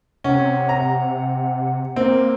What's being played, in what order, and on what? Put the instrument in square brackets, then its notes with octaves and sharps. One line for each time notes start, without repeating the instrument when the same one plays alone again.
[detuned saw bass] C3 [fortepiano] C#4 [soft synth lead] F#5
[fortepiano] A#5
[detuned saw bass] A#3 [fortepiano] C4